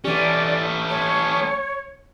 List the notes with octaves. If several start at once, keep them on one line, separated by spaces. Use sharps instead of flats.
E3 A3 C#4 G4 D5
C#5